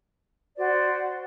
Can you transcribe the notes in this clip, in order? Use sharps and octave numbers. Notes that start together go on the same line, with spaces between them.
F#4 C5 D5